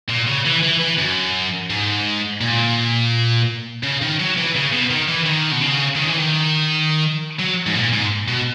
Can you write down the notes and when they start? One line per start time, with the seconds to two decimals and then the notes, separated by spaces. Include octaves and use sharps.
0.09 A#2
0.27 C#3
0.45 E3
0.63 E3
0.81 E3
0.98 F#2
1.70 G#2
2.41 A#2
3.83 C#3
4.02 D#3
4.20 F#3
4.37 E3
4.55 C#3
4.73 B2
4.91 D#3
5.08 E3
5.26 D#3
5.52 B2
5.62 C#3
5.97 D#3
6.07 E3
6.18 D#3
7.39 F#3
7.66 G#2
7.75 A#2
7.93 G#2
8.28 B2